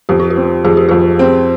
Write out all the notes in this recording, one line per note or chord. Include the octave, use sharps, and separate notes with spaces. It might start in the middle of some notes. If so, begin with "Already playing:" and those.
F2 G4
F4
G4
C4
F2 G#4
G4
F2 F4 G#4
C4